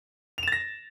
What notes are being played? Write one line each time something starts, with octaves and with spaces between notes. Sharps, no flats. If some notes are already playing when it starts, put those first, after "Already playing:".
A6 A#6 E7 F7